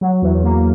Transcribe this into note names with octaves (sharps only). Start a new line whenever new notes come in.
F#3
E2
A#3